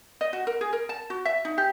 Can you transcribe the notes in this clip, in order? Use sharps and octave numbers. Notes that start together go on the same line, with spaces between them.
D#5
F#4
A#4
G#4
A#4
A5
F#4
E5
D#4
G4